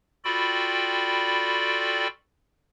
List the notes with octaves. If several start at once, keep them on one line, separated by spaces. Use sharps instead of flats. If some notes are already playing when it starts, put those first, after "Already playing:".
F4 F#4 A4 D5 G5 B5